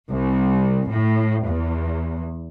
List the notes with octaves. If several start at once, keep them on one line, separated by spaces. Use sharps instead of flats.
C2
A2
E2